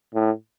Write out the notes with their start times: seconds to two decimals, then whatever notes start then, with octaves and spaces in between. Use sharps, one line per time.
0.15 A2